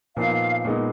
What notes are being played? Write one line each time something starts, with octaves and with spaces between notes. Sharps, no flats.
A#2 F3 B3 D#4 F5
A#2 G#3 B3 D#4